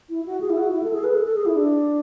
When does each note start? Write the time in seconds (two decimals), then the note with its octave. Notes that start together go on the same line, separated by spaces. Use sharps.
0.09 E4
0.26 F#4
0.41 G#4
0.50 E4
0.57 F#4
0.72 E4
0.83 A4
0.93 G#4
1.04 B4
1.14 A4
1.24 A4
1.35 G#4
1.46 E4
1.56 D4